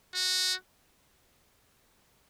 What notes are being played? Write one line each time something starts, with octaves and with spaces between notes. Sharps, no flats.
F#4